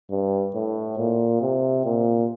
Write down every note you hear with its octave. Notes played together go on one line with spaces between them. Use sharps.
G2
A2
A#2
C3
A#2